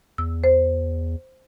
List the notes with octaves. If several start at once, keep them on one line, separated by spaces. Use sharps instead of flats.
E2 E6
C5